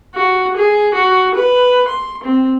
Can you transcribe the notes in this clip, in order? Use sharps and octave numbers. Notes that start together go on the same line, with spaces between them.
F#4
G#4
F#4
B4
C6
C4